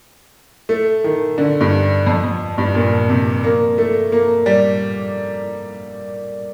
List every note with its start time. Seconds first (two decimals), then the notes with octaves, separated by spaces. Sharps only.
0.69 A3
1.04 D#3
1.38 D3
1.61 G2
2.07 F2
2.23 F2
2.58 G2
2.75 A#2
3.09 C3
3.44 A#3
3.78 A3
4.12 A#3
4.46 G3